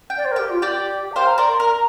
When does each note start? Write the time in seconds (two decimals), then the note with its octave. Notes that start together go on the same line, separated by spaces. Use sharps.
0.10 G5
0.17 D5
0.25 C5
0.31 A#4
0.36 G4 G5
0.50 F4
0.61 G4 D5 G5
1.12 A#5
1.16 C5 F5 G5
1.27 A#5
1.38 A#4 D5 C6
1.49 C6
1.60 A#4 A#5